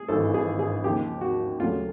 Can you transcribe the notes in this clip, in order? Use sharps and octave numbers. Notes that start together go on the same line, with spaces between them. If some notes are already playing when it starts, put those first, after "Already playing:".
Already playing: G#4
G#1 G2 E3 A4
G#4
G#4
D#2 C#3 F3 G4
F#4
D2 C#3 F#3 F4